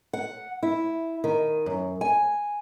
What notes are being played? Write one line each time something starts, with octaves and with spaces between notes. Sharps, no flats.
F#5
E4
D#3
F#2
G#5